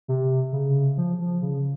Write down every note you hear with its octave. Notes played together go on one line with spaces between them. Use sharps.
C3
C#3
F3
F3
C#3